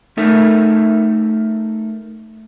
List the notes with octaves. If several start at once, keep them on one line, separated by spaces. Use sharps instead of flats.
A3 D#4 A4 A#4 E5